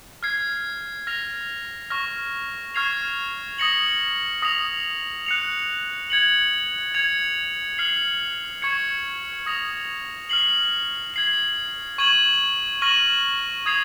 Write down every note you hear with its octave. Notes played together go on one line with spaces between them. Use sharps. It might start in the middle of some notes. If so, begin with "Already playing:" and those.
F6 G#6 C7
F6 A#6 F7
C#6 F6 A#6
C#6 F6 G#6 C7 F7
D#6 A#6 C#7 F#7
D#6 A#6 F7
F#6 C#7 F7
G#6 C#7 F#7
G#6 C#7 F7
F6 C7 F#7
C#6 G#6 C#7
D#6 A#6 F7
F6 C7 F#7
G#6 C7 F#7
C#6 G#6 D#7 F#7
C#6 F6 A#6 D#7 F#7
D#6 G#6 C7 F7